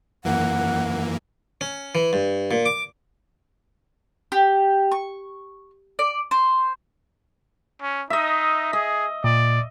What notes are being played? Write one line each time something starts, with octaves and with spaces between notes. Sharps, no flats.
F#2 E3 A#3 F#5
C#4
E3
G2
A#2
D6
G4
C#6
D5
C5
C#4
D#4 D#5 E5
G#4 D#5
A#2 D5